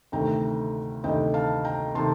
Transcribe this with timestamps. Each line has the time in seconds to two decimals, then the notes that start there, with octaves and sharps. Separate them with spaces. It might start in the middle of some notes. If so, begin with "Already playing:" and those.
0.12 D2 C3 D#3 A3 G5 A#5
1.04 D2 C3 D#3 A3 D#5 G5
1.34 F5 A5
1.64 G5 A#5
1.95 C3 D#3 A3 A5 C6